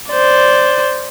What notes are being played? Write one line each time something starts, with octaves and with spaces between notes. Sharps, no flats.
C5 D5